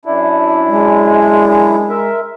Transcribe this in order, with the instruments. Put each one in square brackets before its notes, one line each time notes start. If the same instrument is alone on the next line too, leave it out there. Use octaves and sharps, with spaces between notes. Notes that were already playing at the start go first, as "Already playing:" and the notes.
[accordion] F#2 D4 E4
[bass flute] G#3
[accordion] A#4 E5